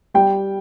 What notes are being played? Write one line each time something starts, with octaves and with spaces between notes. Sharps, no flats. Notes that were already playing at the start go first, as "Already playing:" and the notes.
G3 G5